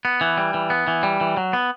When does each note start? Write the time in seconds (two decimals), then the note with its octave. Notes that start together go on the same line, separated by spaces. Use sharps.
0.05 B3
0.21 E3
0.38 G3
0.54 E3
0.70 B3
0.87 E3
1.03 G3
1.21 E3
1.37 F#3
1.53 B3